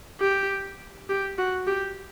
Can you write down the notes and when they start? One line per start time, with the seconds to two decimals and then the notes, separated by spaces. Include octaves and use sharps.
0.21 G4
1.09 G4
1.38 F#4
1.67 G4